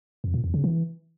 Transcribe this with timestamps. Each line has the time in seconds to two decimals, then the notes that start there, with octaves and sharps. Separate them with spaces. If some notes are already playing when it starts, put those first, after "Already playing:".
0.24 F2
0.34 A#2
0.44 E2
0.54 C#3
0.64 E3